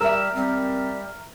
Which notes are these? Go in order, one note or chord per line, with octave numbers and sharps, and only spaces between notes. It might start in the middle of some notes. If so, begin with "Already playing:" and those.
G3 A#4 E5 E6
G3 C4